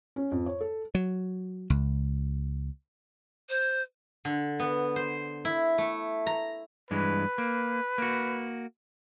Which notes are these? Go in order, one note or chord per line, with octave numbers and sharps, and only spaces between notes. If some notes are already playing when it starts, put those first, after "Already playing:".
C#4
F2
C#5
A4
F#3
C#2
C5
D3
B3
C5
E4
A3
A#5
G2 E3 G#3 B4
A#3
A#3 F#4